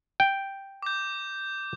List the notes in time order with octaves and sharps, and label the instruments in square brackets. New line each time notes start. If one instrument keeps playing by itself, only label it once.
[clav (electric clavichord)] G5
[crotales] D6 G6